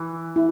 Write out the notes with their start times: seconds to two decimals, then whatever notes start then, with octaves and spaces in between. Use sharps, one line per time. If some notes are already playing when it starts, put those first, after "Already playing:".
Already playing: E3
0.36 E4